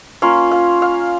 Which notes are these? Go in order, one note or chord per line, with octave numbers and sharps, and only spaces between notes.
A#3 C#4 F4 F5
F5
F5